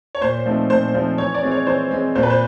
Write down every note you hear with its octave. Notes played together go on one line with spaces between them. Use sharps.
C#5
A#2 C5
F3 A3 C4 D#4
A#2 C5
F3 A3 C4 D#4
E3 C#5
D5
G#3 C4
C#5
E3 C5
G#3 C4
A#2 C5
B4
C5